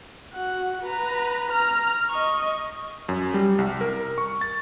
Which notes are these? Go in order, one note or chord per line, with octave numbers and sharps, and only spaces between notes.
F#4 F#5
B4 A#5
A#5 F6
D#5 C#6
F#2
G3
C2
A#4
C#6
A6